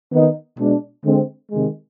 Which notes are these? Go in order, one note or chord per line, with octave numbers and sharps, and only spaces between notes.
D#3 B3 D#4
B2 G#3 D4
D3 G#3 C4
C3 D#3 G#3